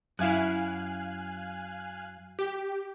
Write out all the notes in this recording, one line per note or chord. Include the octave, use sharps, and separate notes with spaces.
F#2 E4 F5 G#5 F#6
G4